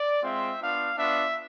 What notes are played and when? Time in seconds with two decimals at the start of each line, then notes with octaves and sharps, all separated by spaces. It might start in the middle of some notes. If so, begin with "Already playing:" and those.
Already playing: D5
0.23 G#3 C4 F4 E5
0.61 B3 D4 F4 F5
0.97 B3 D4 F4 E5